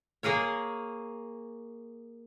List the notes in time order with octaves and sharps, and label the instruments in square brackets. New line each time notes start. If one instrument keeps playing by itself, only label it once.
[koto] A#3 G#4 A#4 C#5